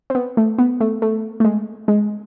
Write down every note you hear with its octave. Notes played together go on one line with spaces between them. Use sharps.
C4
B3
A3
B3
A3
A3
A3
G#3
G#3